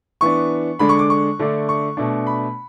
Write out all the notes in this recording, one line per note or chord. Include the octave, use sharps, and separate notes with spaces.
E3 B3 D4 C#6
D3 G#3 D4 B5
C#6
D6
C#6
D3 A3 D4
C#6
B2 A3 D4
B5